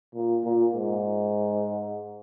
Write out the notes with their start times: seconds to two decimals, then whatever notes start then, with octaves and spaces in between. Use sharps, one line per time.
0.15 A#2
0.44 A#2
0.74 G#2